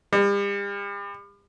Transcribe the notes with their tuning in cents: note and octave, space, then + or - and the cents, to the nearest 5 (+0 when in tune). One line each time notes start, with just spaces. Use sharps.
G3 +40